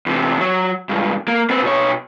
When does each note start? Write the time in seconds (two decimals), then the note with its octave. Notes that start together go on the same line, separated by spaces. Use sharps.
0.06 E2 C3
0.40 F#3
0.89 C#2 G2
1.28 A#3
1.50 B3 C4
1.62 B2 C#5